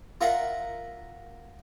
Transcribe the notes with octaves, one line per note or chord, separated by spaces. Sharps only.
F4 A#4 E5 F#5